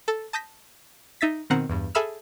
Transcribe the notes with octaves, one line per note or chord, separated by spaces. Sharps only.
A4
A5 D#6 G6 A#6 B6
D#4 E5 A6 B6
B2 D#3 C4 F#5 A#5
E2 G2
G#4 A4 E5 B5 E6 F6